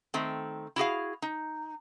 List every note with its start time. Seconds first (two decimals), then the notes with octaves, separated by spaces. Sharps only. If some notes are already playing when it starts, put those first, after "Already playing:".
0.14 D#3 A3 C4
0.76 E4 F#4 G#4 F5
1.22 D#4